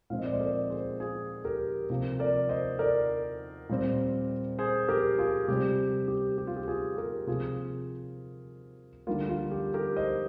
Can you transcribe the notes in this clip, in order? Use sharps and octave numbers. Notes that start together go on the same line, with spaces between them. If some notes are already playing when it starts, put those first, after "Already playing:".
A#2 F3 G#3 C4 F5
D#5
D5
C5 D#5
A#4 D5
G#4 C5
F4 G#4
G4 A#4
C3 F3 A#3
A#4 D5
C5 D#5
A#4 D5
A#2 G3 C4
G#4 C5
G4 A#4
F4 G#4
C3 G3 C4 G4
G4
G4
F4
G4
F4 G#4
G4 A#4
C3 F3 A#3 F4 G#4
D3 G3 A#3 F4
F4
G4
G4 A#4
C5 D#5